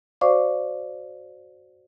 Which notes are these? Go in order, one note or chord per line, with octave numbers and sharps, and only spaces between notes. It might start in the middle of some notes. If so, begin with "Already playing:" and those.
F#4 C5 D5 F5 C#6 D6